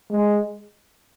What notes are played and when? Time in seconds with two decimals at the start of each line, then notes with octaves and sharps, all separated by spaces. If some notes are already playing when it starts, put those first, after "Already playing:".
0.11 G#3